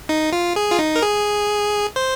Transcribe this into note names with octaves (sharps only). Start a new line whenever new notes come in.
D#4
F4
G#4
F4
D#4
A#4
G#4
C5